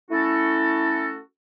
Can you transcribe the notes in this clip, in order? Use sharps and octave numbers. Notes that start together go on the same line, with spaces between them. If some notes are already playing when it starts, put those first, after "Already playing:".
A3 C#4 E4 F#4 A4